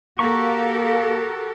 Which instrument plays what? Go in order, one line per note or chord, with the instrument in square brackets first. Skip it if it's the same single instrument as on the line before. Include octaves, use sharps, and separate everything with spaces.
[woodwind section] A#3 [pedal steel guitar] F#4 A#5 C#6 [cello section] G4 A4 A#4